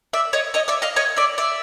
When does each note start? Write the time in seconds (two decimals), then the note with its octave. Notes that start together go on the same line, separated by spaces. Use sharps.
0.13 D5 E5
0.33 C#5 D#5
0.54 C#5 D#5
0.68 D5 E5
0.82 D#5 F5
0.96 C#5 D#5
1.16 D5 E5
1.38 D5 E5